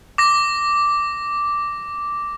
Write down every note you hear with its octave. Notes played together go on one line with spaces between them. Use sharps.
D6 A#6